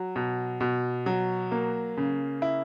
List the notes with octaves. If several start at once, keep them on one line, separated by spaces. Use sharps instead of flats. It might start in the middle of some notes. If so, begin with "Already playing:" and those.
Already playing: F#3
B2
B2
F#3
A#3
C#3
E4